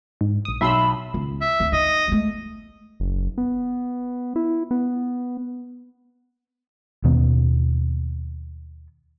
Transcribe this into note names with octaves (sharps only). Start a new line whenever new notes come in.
G#2
A#1 D#6
B1 E5 B5 C6 E6
C#2
E5
D2
D#4 D#5
G#3 A3
F#1
B3
E4
B3
D#2 B2 D#3 B3